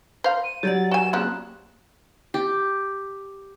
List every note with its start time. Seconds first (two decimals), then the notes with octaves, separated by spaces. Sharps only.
0.24 C5 F5
0.44 D#7
0.63 F#3 G4 D5 F#5 A6
0.91 F#4 G#5 E7
1.13 C#3 F3 A#3 C4 F#6
2.34 G4